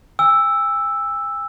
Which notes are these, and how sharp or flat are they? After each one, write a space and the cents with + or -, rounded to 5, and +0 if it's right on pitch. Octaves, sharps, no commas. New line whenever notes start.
G#5 -45 E6 +0